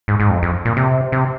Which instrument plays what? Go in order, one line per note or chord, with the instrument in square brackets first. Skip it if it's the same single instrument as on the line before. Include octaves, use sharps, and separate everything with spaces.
[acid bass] G#2
G#2
F2
F2
A#2
C3
C3